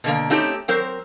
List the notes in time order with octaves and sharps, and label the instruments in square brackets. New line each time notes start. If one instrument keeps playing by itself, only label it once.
[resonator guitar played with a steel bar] B2 D3 A#3
A3 C4 C#4 D#4 G4
F#3 C4 A#4 C5